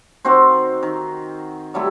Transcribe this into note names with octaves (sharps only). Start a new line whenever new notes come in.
D#3 C4 F#4 C5
D#3
F#3 G3 A3 E4